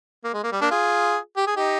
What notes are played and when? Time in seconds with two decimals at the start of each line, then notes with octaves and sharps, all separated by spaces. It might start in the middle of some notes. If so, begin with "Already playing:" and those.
0.24 A#3
0.34 G#3
0.43 A#3
0.52 G3
0.61 A#3 D4
0.71 F4 G#4
1.37 G4
1.47 G#4
1.56 D#4 G4